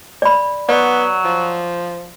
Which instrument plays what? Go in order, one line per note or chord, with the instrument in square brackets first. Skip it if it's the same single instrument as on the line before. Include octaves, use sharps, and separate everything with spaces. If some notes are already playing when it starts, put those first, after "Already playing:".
[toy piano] D5 B5
[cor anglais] F#3 [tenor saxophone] B3 [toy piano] D5
[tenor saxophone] F3